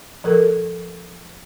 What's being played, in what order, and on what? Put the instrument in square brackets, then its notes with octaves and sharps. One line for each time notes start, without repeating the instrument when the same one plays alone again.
[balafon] F3 A4 A#4